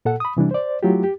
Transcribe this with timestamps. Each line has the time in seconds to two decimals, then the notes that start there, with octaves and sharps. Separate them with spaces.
0.05 A#2 A4 F#5
0.20 B5 D#6
0.37 C3 E3 G3 D4
0.51 C5 D5
0.83 F#3 A3 E4 F4 G4
1.04 G4